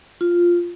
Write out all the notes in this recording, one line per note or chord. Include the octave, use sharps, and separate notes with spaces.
F4